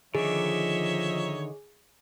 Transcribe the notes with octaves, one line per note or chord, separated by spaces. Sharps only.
D3 D#3 F3 D#4 G#4 C#5 E5